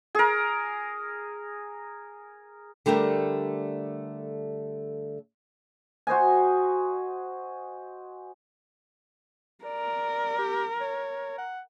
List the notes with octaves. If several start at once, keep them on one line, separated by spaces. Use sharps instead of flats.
G#4 A#4
D3 G3 A3 G4 A#4
F#4 C5 D#5 G#5
A#4 D5
G4
C#5
F#5